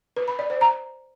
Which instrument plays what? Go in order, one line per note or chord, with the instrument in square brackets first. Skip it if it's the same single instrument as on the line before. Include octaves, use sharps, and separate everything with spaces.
[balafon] B4
B5
D5
C5
A#5